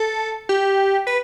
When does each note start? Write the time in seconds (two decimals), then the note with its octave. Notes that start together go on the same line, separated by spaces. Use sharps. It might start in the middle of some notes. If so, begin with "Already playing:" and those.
Already playing: A4
0.49 G4
1.07 B4